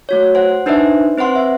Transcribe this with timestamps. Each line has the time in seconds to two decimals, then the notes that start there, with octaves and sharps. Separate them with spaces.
0.09 A3 F#4 C#5
0.35 C5 F#5
0.66 D4 D#4 B4 C5 D5 E5
1.18 C4 B4 C5 F#5 C6
1.35 E5